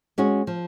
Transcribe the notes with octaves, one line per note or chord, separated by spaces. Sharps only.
G#3 C#4 F#4
F3